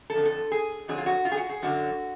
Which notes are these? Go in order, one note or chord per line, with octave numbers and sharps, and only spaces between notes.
A4
F2 D3 F3
A4
G#4
F2 D3 F#3 G#4
F4
F#4
F4
G#4
F#4
G#4
F#2 D3 F#3 F#4